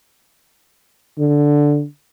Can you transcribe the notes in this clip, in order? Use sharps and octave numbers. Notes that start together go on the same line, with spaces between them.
D3